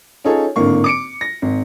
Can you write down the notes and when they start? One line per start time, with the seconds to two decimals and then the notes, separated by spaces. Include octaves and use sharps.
0.24 C#4 D#4 F4 G#4 A4 C#5
0.56 G#1 A2 D3 A#3 C#6
0.84 D6 C#7 D7
1.21 A#6
1.42 G#1